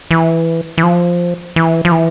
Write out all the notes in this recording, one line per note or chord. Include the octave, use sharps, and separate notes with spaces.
E3
E3
F3
E3
F3
E3